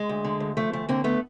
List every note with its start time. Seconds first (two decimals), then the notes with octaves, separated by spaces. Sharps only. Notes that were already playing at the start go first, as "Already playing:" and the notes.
Already playing: G#3
0.09 D2
0.25 D3
0.40 D2
0.57 F3 A3
0.73 D2 A3
0.89 D3 A#3 C4
1.04 A3 B3